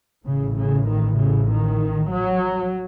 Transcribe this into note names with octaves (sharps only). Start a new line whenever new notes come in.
A1 A2 C#3
C#3
D#3
C#3
D#3
F#3